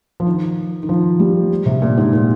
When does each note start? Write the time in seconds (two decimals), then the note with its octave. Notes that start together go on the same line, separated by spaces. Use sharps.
0.20 F3
0.27 D#3
0.83 D#3
0.89 F3
1.19 G3
1.66 C3
1.82 A#2
1.97 G#2
2.13 A#2